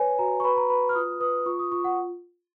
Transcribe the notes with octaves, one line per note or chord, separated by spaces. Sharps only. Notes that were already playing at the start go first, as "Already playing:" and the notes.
Already playing: B4 C#5 G#5
F#4 A#5
C#6
B4 B5
A#5
B4 B5
F6
F4 D#6
B4 D#6
F4 C#6
D#6
F4 C#6
F#5